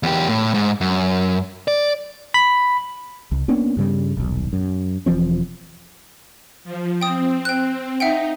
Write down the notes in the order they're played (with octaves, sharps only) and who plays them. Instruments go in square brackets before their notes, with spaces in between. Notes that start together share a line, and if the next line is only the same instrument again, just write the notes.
[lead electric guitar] E2 G4
A2
G#2
F#2
D5
[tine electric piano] B5
[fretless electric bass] C2
A#3 B3 C#4 D4
G2 C#3 G3
D#1 B1
F#2
E1 E3 F3 C4
[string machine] F3
[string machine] C4 [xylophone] G5 D#6
[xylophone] G5 F#6
[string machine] D#4 [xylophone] E5 F#5 G5